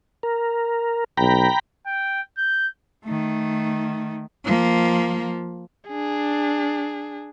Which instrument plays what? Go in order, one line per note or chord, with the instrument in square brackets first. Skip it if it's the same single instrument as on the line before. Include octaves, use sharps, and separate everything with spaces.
[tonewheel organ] A#4
[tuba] B1 [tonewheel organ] G5 A#5 B5
[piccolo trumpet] G5
G6
[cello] D#3 A3
F3 A#3
[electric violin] D4 G#4